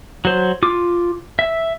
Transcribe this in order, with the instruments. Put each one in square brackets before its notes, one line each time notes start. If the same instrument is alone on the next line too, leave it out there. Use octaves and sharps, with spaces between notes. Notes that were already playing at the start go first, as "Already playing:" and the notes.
[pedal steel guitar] F#3 C5
F4 D6
E5